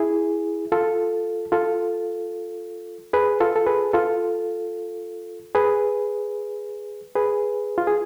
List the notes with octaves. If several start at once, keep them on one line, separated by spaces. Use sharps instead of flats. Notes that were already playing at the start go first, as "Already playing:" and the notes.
Already playing: E4 G#4
F4 A4
F4 A4
G#4 B4
F4 A4
A4
G#4 B4
F4 A4
G#4 B4
G#4 B4
F4
G#4